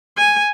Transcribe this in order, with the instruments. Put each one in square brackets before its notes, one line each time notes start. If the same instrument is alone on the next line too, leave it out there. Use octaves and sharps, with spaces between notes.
[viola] G#5